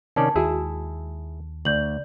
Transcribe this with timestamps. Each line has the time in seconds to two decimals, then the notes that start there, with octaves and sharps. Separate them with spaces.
0.16 C3 D#3 C#4 D5 A5
0.36 D#2 G#3 E4 F#4 G#4 E5
1.65 D2 D5 G6 F#7